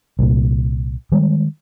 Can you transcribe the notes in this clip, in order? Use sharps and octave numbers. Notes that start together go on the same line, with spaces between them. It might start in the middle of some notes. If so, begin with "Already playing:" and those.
C2 A#2
D#3 G3 G#3